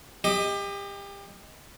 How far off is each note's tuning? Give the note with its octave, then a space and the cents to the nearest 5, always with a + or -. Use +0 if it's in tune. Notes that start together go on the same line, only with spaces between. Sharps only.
G4 +30 D#5 +0